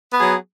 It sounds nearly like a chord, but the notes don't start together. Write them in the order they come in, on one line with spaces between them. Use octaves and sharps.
B3 G#4 F#3